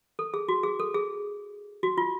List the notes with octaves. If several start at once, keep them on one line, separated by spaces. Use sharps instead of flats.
A4
G#4
F#4
G#4
A4
G#4
F#4
F4